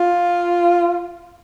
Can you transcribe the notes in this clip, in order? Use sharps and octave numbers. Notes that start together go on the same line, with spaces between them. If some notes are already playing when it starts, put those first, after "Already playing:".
Already playing: F4